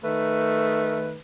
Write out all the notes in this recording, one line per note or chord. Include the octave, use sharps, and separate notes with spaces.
D#3 A3 B4